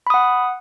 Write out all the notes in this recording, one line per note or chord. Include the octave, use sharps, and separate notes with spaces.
F#5 B5 D#6